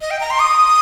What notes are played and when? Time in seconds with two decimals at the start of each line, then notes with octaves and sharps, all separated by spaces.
0.01 D#5
0.11 G5
0.21 A#5
0.30 C6
0.39 D#6